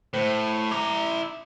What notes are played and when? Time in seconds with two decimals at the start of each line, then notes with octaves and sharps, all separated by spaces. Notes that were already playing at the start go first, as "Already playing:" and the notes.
0.14 A2 C5
0.71 E4 A#5 D6